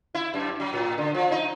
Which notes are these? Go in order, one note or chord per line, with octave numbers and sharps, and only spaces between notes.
E4
F#2
F#3
A2
D3
F3
D#4